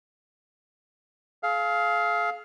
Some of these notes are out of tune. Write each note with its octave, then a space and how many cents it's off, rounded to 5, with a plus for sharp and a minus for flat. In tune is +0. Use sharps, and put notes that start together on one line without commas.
G#4 +40 F5 +0